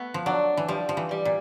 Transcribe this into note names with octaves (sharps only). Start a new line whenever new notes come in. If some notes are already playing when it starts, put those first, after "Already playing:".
Already playing: A3 B3
F3
F#3 D4
E3
F3 G3
F3
E3
G3
A#2